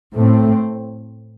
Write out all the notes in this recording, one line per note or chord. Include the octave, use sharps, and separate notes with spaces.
A2 A3 C4